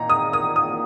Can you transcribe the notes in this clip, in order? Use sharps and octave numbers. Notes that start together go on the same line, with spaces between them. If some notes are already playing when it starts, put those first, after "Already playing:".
Already playing: A#2 D#4 A#5
D#6
D#6
D#6